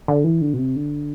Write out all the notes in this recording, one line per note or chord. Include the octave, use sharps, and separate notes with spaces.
D3
E3
D3
B2
C3
D3